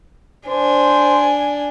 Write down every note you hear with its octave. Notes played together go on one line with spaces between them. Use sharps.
D4 C5 G#5